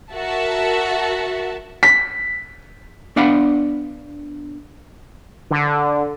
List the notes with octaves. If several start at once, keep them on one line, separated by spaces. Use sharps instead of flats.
F#4 A#4 E5 A5
B6
B3 D4 D5 F5 F#5 B5
D3